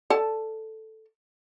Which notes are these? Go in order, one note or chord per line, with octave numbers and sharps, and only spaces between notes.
A4 D5 A5